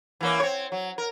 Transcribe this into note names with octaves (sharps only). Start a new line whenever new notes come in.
E3 A#3 C#4
C4 C#5
F#3
A#4